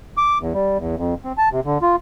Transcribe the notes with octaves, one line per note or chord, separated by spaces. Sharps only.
D6
E2
G3
E2
F2
C4
A5
C3
D3
F4